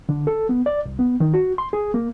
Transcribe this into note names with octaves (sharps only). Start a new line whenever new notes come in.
D3
A4
B3
D5
C2
B3
D#3
F#4
C6
G#4
A#3